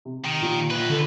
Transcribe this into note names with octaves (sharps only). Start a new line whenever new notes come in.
C3
D#3
A#2 F3
F#2 B4
D3